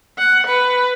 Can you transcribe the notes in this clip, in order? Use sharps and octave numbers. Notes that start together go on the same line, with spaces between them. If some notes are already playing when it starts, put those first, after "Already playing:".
F#5
B4